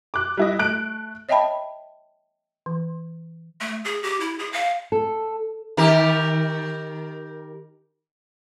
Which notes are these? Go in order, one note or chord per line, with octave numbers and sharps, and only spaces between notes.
D6 F#6
G3 E4 D#5
A3 F#6 D7
C#5 D#5 E5 G5 A5 B5
E3
A3
G#4
G4
E4
G#4
F5
A4
D#3 G4 A#4